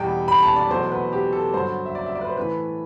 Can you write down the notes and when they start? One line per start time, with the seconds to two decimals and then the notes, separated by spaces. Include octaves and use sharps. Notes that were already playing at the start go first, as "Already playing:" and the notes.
Already playing: E2 B2 G3 G5
0.28 B5
0.43 A5
0.56 D5
0.70 E2 B2 F#3 A3 C5
0.92 B4
1.12 G4
1.33 A4
1.54 G2 D3 F#3 C5
1.86 E5
1.95 D5
2.06 E5
2.15 D5
2.21 B4
2.27 C5
2.37 A2 E3 A3 B4